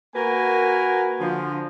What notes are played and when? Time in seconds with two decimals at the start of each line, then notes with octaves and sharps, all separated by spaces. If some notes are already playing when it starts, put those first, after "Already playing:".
0.16 A#3 F#4 A#4 B4 G#5
1.20 D3 F3